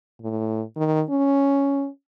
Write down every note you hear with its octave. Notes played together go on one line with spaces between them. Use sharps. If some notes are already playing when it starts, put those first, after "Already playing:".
A2
D#3
C#4